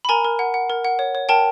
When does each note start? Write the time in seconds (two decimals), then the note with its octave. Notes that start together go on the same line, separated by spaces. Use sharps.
0.05 B5
0.09 A#4 G#5 A#5
0.24 A#4
0.39 F#5
0.54 F#5
0.70 A#4
0.85 F#5
0.99 C#5
1.15 C#5
1.29 A#4 G5 A5